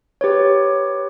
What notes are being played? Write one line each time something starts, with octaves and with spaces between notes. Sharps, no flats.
G4 B4 C#5